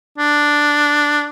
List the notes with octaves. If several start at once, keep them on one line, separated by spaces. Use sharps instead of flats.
D4